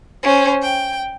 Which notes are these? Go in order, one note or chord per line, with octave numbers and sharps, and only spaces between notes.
C#4 C5
G5